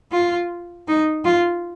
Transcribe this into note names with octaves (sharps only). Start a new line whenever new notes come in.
F4
D#4
F4